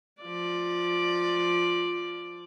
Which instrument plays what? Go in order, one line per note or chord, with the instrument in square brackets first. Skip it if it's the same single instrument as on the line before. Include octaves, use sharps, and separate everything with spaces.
[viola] F3 D5